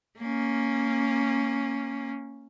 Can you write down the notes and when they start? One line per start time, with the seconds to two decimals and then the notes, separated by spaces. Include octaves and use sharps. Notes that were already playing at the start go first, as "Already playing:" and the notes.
0.19 A#3 C#4